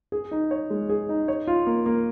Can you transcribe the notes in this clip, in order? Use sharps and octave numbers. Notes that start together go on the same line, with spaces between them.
G#4
D#4
C#5
G#3
G#4
D#4
C#5
F4
A#3
A#3